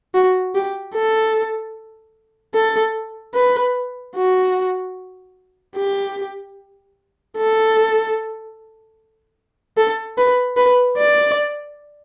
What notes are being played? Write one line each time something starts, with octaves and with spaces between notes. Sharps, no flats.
F#4
G4
A4
A4
B4
F#4
G4
A4
A4
B4
B4
D5